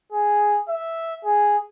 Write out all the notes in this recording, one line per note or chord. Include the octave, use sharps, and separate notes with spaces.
G#4
E5
G#4